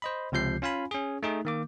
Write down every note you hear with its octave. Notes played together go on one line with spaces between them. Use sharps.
C5 D#5 B5
C#2 C3 F3 G6 C7
C#4 F4 F5 G#5 B5
C#4 G#4
A3 D#4 G#4
D#3 A#3 D6